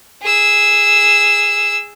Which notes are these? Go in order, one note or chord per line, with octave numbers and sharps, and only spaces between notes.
G#4 E6